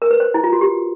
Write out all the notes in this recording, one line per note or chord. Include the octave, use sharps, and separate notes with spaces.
A#4
B4
C5
E4
F4
F#4
G4